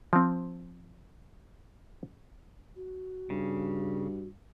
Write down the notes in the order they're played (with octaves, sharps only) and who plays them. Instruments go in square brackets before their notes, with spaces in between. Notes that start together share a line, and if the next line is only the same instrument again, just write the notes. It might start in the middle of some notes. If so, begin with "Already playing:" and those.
[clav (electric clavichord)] F3 C4
[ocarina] F#4
[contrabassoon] G2 [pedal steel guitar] C#3